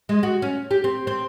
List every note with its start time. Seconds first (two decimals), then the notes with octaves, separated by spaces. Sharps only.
0.09 G#3
0.23 F#4
0.42 C#4
0.71 G4
0.84 C4
1.07 C4